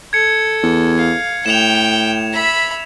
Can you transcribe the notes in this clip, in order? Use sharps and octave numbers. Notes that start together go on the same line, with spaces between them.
A4 G#6 C#7
E2
F5
A2 G5 E7 F7
E5 B5